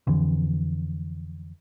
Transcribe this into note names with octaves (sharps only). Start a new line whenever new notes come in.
F2 D3 E3